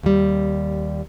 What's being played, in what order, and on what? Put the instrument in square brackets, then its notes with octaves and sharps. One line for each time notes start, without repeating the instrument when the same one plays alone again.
[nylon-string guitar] D#2 G3